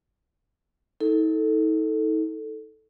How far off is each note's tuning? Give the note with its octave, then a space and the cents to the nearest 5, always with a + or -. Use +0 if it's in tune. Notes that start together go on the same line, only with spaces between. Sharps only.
D#4 +40 A4 +0